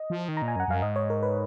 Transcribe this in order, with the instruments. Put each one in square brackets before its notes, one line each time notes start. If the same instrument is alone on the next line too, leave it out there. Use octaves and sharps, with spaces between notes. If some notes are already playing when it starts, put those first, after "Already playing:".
Already playing: [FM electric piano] D#5
[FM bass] F3
D#3
[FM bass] A#2 [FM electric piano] A#5
[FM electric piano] G#5
[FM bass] F#2
[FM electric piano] F#5
[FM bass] F#2 [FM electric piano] F5
[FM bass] G#2 [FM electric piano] D#5
[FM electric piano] C#5
A#4
B4